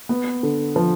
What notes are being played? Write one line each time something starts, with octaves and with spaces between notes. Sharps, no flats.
B3
D3
F3